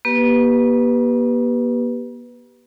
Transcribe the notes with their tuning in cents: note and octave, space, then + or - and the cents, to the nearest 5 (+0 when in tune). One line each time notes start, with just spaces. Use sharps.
A#3 +45 G4 +0 B4 +0